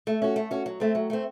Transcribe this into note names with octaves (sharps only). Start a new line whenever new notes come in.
A3
C#4 F#4
A3
C#4 F#4
F#3
A3 C4
F#3
A3 C4